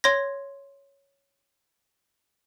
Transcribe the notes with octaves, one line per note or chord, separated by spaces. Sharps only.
C#5 C6 G#6 A#6